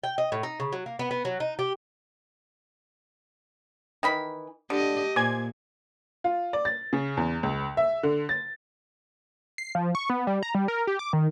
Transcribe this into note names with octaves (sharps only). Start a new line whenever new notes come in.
G5
D#5
A2
D#4
C#3
F#3
A#3
B3
B3
F#3
D#4
G4
D#3 E3 B5
D3 G4 D#5
A#2 C5 D5 G#5 G#6
F4
D5
A6
C#3
E2
C#2
E5
D3
A6
C7
F3
C#6
B3
G3
A#5
G3
A#4
G4
D6
D#3